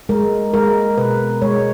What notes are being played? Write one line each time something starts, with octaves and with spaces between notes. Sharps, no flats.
G#3 A#4
G#3 A#4
B2 B4
G#3 C#5